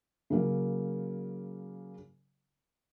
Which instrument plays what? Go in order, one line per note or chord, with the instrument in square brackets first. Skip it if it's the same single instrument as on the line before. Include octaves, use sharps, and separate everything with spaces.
[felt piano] C#3 F#3 A#3